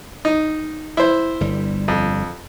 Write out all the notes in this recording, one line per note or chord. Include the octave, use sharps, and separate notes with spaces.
D#4
E4 C5
G1 G3
F2